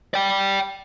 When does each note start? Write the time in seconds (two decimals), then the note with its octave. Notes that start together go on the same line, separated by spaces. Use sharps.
0.14 D5 G5